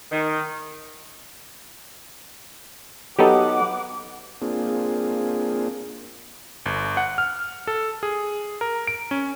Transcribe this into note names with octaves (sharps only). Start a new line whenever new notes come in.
D#3
F#3 B3 D#4 G4 A4 F#5 D6
A#3 C4 D4 F4 G#4
G1
F#5
F6
A4
G#4
A#4
D7
C#4